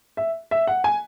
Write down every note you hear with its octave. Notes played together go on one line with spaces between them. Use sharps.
E5
E5
F#5
G#5